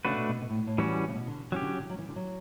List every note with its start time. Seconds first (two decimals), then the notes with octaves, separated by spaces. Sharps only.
0.04 C#3 A3 D4 F#4 B4
0.17 B2
0.28 B2
0.42 B2
0.50 A2
0.67 A2
0.78 E3 G3 C#4 F#4
1.08 C#3
1.15 B2
1.27 D3
1.52 E3 F#3 C#4 G4
1.62 D3
1.79 D3
1.90 F#3
1.98 E3
2.08 D3
2.16 F#3